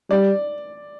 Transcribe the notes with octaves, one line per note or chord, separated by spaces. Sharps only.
G3 D5